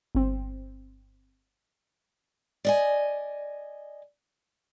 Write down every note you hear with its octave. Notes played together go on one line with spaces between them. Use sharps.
G1 C4
D5 D#5 G#5